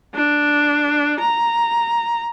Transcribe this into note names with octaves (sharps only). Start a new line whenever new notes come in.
D4
A#5